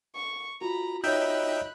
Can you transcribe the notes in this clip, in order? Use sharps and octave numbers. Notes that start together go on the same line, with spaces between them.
C#6
F4 F#4 A#5 B5
D#4 C#5 D#5 E5 G5 B5 F#6 G6